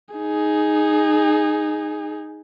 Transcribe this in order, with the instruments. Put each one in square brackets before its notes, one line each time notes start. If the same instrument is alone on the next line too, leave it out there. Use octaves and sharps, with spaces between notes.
[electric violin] D#4 G#4